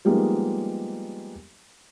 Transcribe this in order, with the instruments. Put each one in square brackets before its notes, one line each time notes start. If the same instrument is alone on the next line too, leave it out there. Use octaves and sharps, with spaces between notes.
[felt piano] F3 G3 G#3 A#3 B3 D#4